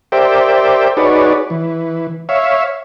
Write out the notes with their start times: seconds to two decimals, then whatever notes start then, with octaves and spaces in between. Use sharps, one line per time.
0.12 G4 A#4 C5 D5 E5 G5
0.97 D#4 F#4 G#4 B4 C#5 D5
1.50 E3
2.29 C#5 E5 F5